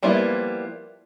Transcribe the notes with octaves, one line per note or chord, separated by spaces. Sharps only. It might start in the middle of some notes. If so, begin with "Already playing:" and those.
F3 G3 A#3 B3 E4